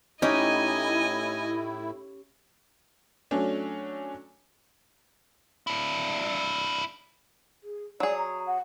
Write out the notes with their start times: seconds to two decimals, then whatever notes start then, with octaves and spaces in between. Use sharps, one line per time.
0.22 A2 C#4 D#4 E4 G4 D#5 G#5
3.31 F#3 A3 C#4 D4
5.67 D4 E4
7.61 G#4
8.00 F#3 G#4 D5
8.18 A#5
8.47 F#5